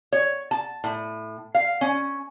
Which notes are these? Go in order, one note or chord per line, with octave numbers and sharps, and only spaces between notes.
C#5
A5
A2
F5
C#4